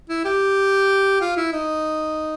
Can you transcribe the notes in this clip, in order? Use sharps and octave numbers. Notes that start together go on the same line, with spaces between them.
E4
G4
F4
E4
D#4